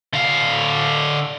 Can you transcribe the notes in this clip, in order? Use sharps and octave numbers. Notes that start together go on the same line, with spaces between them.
D3 F5